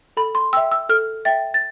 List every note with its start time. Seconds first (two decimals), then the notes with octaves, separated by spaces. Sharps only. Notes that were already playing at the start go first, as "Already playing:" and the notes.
0.17 A4 B5
0.35 C6
0.53 G5 E6
0.57 E5
0.71 E6
0.89 A4 F6
1.25 E5 G5 A6
1.54 A6